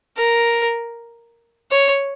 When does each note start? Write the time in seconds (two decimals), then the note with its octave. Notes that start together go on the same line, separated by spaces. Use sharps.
0.18 A#4
1.71 C#5